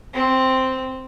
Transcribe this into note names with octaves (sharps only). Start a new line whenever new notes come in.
C4